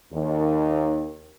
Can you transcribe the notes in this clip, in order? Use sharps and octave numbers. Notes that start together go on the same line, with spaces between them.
D#2